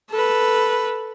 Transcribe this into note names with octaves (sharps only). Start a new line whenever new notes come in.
A4 B4